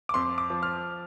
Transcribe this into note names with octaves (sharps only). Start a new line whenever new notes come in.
D6
F2 C6
D6
F3
F6